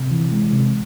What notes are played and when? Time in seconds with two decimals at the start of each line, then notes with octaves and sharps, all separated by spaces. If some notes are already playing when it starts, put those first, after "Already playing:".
Already playing: C3
0.11 E3
0.31 G#3
0.53 C3